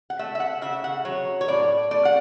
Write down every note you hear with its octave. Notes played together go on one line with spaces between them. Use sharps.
F#5
A3 E5
E5
F#5
C#3 E5
F#5
F#3 C#5
C#5
A2 D5
A3 D5
F#5